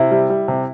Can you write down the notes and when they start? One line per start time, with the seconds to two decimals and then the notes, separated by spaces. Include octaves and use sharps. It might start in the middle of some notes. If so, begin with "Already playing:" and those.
Already playing: C3 E4
0.11 G3
0.30 G3
0.48 C3